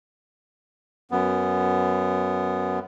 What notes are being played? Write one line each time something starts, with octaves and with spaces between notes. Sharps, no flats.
F#2 B3